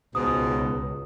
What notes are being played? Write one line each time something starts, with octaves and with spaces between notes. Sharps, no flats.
C#2 G#2 B2 D#6